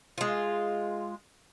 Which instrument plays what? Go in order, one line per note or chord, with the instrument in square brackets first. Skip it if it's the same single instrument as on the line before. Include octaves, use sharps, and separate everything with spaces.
[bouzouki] G#3 F4